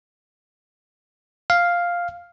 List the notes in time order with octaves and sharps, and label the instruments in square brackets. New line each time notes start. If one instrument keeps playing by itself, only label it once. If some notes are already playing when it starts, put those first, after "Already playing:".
[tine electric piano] F5